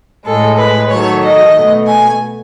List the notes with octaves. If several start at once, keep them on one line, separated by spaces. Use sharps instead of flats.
A2 G#3 A4
B4
D#3 F#3 A3 C#5
D#5
B2 A3
G#5